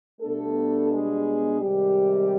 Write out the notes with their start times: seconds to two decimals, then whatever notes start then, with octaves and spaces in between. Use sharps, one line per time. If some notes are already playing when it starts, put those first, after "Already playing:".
0.21 B2 G3 A3 B3 D4 A4
0.91 G#3 G#4
1.60 C3 D#3 G3 G#3 G4